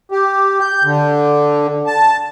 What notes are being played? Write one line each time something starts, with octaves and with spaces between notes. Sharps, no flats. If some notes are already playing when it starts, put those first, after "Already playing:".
G4
G6
D3
A5